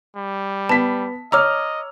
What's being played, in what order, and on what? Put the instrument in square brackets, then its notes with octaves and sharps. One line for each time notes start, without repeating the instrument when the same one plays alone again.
[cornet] G3
[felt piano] B3 B6 [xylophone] A5
[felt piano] C#5 E6 [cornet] D#5 [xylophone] A#5 D6 F6